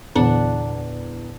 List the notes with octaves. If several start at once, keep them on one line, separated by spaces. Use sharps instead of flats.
E2 A#2 D3 D4 F#5